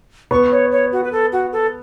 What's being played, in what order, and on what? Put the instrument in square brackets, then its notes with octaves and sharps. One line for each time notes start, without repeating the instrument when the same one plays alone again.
[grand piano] B3 [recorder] C#6
[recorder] C#5
C#5
F#4
B4
A4
F#4
A4